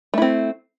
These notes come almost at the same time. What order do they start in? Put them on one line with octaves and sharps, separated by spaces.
A3 E4 C4